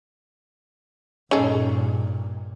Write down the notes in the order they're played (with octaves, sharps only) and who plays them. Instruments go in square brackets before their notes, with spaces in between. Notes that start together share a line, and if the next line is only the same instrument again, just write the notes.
[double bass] G2 A#2 [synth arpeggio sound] C#4 [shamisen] D#4 G#4 A4